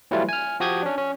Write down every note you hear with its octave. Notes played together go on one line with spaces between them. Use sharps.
E3 F#3 G3 A3 E4 F4
G#5 F6
F3 F#4 G4 D#6 G6 G#6
C#4 D4
C#4